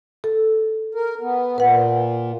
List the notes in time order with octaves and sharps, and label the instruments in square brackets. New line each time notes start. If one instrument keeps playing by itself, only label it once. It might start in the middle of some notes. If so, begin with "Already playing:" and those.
[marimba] A4
[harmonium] A#4
B3
[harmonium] A#2 [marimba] B4 F#5